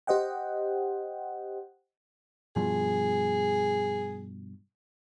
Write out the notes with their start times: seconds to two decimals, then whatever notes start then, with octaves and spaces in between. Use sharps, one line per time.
0.07 G4 C5 D#5 F#5 G5
2.56 G2 B2 F3 G#4